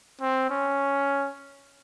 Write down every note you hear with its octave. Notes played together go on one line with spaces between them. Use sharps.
C4
C#4